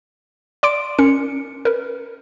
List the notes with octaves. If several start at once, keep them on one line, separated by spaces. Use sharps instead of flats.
D5 C6 D6 D7
C#4 A#4 C#7
A#4 B4